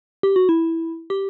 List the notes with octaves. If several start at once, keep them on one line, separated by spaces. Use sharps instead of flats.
G4
F#4
E4
G4